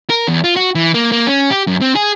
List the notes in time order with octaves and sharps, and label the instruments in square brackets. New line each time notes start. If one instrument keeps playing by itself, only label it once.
[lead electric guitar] A#4
E2
F4
F#4
E3
A#3
A#3
C#4
G4
F#2
C4
G#4